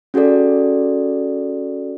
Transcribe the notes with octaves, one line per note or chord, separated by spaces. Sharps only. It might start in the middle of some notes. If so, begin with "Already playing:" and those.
C#4 F#4 G#4 A4 D5